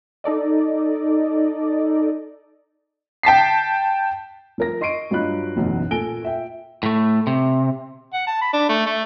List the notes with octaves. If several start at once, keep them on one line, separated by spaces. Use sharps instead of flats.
D#4 A4 D5 D#5
G5 A5 B6 C7
F3 A#4 A#6
D#5 C6 C#6 C7 D7 D#7
G2 F#3 F4 D#5 B5 F#6
F#1 B1 E2
A#2 A4 G#5 A#6 D7 G7
F4 E5 G5
A2 A3
C3
F#5
A5
B5
D4
A3
A3